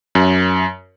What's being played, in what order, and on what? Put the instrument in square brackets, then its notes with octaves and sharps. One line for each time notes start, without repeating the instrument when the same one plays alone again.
[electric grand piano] F#2